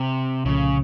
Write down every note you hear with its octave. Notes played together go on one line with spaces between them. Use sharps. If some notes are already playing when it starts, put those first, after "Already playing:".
Already playing: C3
C2 A#2 C#3 F3 A3